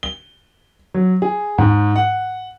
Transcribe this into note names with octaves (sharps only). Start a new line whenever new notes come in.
G7
F#3
G#4
G#2
F#5